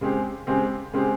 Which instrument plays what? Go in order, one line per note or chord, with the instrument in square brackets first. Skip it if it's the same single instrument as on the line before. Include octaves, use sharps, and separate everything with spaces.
[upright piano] C#3 G#3 C4 G4
C#3 G#3 C4 G4
C#3 G#3 C4 G4